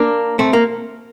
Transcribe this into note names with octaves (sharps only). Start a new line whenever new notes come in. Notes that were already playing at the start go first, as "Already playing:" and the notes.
Already playing: A#3 D4
A3 C4
A#3